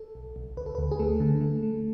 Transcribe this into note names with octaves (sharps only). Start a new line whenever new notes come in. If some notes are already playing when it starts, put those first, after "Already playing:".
Already playing: A4
B1
B1
D2 B4
A4
D2 B4
G#4
A3 A4
D3
A3
A3